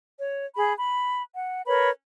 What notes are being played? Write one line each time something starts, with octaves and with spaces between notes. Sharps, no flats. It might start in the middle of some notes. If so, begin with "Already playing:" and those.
C#5
G#4 B5
B5
F#5
A#4 B4 C#5 B5